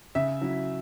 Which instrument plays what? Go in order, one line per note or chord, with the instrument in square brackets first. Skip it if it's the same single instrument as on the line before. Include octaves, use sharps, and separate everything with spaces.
[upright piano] C#3 E5
F#3 C#4 E4